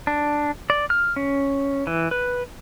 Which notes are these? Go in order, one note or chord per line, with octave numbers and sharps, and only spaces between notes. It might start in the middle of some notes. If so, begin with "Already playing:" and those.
D4
D5
F6
C#4
E3
B4